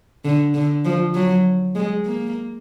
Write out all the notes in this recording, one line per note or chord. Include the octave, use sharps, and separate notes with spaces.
D3
D3
F3
F#3
G#3
A#3